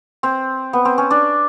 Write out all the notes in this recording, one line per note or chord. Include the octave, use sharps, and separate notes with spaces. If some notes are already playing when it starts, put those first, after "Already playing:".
C4
B3
C4
C#4
D4